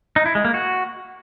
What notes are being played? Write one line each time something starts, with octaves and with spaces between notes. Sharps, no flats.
D#4
E4
G#3
A#3
F#4